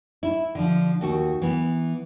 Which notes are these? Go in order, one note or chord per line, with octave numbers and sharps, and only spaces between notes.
E4
D3 F3
D#2 F#4
E3 B3